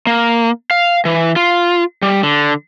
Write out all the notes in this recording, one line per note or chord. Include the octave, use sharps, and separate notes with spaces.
A#3
F5
E3
F4
G3
D3